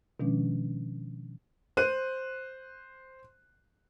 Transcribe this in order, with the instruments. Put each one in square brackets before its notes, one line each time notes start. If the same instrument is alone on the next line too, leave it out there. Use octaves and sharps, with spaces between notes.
[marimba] B2 D#3 F3 G#3 C#4 D4
[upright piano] C5 F#6 D#7